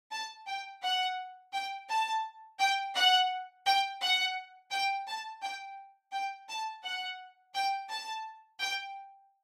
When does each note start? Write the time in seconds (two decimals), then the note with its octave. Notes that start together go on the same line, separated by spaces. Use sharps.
0.12 A5
0.47 G5
0.83 F#5
1.53 G5
1.89 A5
2.59 G5
2.95 F#5
3.66 G5
4.02 F#5
4.71 G5
5.08 A5
5.42 G5
6.13 G5
6.49 A5
6.84 F#5
7.55 G5
7.89 A5
8.60 G5